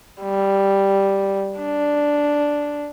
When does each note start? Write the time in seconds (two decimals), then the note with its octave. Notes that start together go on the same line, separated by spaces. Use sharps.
0.21 G3
1.58 D4